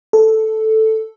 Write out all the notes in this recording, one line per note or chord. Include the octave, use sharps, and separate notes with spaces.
A4